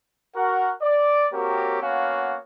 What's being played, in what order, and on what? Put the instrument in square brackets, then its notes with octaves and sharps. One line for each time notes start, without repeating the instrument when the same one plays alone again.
[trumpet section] F#4 A#4 F#5
D5
A#3 C4 F#4 G4 A#4 C#5
A#3 B3 C#4 F#4 C#5 F5